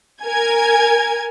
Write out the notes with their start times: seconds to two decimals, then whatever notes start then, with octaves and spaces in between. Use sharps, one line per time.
0.23 A#4 G#5 G#6